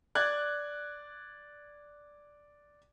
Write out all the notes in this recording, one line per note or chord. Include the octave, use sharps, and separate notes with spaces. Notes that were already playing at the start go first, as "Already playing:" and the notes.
D5 F#6 G#6